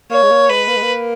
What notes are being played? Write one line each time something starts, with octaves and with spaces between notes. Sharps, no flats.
A#3 C#5
G#3
A#3
G#3 B4
A#3
G#3
A#3